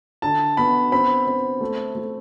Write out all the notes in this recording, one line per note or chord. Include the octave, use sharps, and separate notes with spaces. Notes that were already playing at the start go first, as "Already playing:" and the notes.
D3 A5
B3 B5
C4 B5
C4
A3
A3